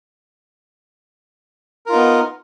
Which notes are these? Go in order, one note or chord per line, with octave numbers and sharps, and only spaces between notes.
B3 D#4 F4 A#4